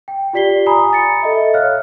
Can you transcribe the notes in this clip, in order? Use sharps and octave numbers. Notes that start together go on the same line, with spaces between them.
G5
F4 G4 D5 B6 C7 G7
G#5 A#5 B5 D#6
A6 C#7
A4 D#5 E5
C#5 F5 F6 F#6